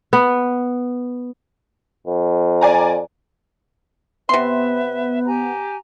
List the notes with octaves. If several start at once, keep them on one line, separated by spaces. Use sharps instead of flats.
B3
F2
D5 G#5 A#5
C3 B3 B4 E5 C6
G4 G#5 A#5